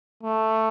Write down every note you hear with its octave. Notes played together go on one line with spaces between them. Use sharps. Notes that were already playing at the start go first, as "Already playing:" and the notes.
A3